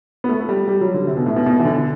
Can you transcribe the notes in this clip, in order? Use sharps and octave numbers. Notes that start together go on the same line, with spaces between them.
B3
A3
A3
G3
G3
F#3
D3
C3
B2
A2
B2
B2
E3
D3